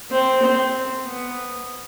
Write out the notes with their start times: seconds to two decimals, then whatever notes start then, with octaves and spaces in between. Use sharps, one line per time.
0.11 C4
0.43 C4
1.06 B3